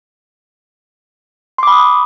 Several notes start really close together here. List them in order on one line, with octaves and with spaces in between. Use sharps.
C6 D6 B5 D#6